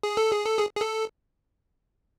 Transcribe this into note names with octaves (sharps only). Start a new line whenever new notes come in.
G#4
A4
G#4
A4
G#4
G#4
A4